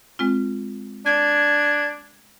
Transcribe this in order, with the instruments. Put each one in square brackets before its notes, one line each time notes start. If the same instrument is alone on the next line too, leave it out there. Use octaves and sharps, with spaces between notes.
[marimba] G#3 C4 F4
[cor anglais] D4 [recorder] G#6